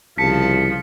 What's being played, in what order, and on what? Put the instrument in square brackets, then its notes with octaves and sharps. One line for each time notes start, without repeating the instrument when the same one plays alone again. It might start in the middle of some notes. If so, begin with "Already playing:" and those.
[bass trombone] C2 [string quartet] C#3 F3 [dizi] A5 [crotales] B6 C#7